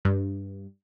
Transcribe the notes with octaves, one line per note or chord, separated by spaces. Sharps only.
G2